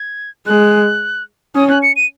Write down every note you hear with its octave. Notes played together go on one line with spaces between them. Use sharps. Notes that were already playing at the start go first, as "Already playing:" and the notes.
Already playing: G#6
G#3 F#6
C#4 D#6
F#6
C#7
D#7